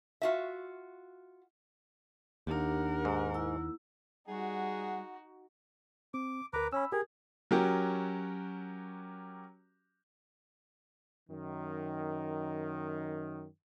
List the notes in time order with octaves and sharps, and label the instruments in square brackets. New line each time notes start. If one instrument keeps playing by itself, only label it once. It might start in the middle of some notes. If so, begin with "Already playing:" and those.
[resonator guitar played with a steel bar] F4 F#4 E5
[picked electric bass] D#2 [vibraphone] D4 G4 [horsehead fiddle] A#4 F#5
[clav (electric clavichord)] G#2
[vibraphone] E4 E6
[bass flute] G3 [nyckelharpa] D#4 F#4 [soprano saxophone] G#4 [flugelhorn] F#5
[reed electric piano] C4 [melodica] D6
[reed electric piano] D2 A#4 [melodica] B4 A#5 D6
[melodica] C#4 [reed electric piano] B5 E6
[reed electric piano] G4 A#4 [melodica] G#4
[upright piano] F#3 C#4 F#4 G4 A#4
[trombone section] F#2 D#3